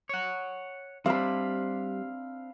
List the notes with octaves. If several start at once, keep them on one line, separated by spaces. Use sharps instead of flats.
C#5 F#5
G3 C4 D4 F5 B5